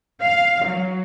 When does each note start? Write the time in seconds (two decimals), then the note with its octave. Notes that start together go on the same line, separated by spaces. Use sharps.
0.22 F5
0.66 F#3